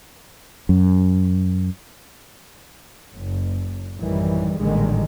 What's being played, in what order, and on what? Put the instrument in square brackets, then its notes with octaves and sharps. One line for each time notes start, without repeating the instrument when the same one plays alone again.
[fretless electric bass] F#2
[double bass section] F#1
A1 F#2 A2 D#3 E3 G3
A1 A#2 D3 D#3 G3 G#3